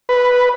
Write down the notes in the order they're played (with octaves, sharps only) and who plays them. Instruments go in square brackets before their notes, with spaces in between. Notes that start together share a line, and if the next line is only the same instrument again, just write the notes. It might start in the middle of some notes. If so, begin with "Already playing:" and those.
[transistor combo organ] B4